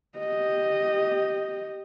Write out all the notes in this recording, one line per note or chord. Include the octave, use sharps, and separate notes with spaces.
G4 D#5